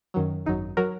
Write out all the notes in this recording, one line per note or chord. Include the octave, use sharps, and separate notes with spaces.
F#2 D#3 F#3
G#1 F#2 F#3 D#4
F#3 A#4